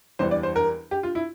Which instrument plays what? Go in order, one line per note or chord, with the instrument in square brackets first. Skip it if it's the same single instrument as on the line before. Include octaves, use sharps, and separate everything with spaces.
[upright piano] E2 E3 G3 C5
D5
C5
A#4
G4
F4
E4